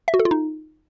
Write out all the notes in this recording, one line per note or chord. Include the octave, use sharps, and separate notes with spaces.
E5
F#4
A4
F4
D#4